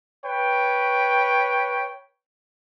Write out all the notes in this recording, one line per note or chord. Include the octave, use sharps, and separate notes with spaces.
B4 C#5 G5